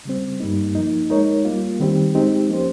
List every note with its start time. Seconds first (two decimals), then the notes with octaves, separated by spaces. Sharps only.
0.05 C#3 G3 C4
0.40 G2 G3 A#3 D#4
0.75 F3 A#3 D#4
1.10 G#3 D#4 A#4 C#5
1.45 G3 A#3 F4
1.80 D#3 G3 C4 G4
2.15 G#3 C4 D#4 G4
2.49 F3 A#3 C#4 G4 C5